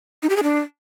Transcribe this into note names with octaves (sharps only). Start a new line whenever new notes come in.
D#4
G4
G#4
D4